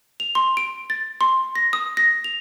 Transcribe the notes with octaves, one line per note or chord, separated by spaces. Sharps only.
F7
C6
D7
A6
C6
A#6
D#6
A#6
F7